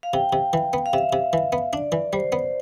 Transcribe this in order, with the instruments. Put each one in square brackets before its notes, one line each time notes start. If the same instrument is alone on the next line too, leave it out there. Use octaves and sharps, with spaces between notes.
[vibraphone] F5
[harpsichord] C3 [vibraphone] G5
[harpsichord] C3
E3
B3
[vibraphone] F5
[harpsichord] C3 [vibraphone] E5
[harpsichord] C3
E3
B3
[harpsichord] D4 [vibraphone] D5
[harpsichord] E3
[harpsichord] G3 [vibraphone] C5
[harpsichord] B3